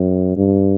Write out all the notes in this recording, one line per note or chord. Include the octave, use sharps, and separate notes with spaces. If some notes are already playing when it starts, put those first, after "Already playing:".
Already playing: F#2
G2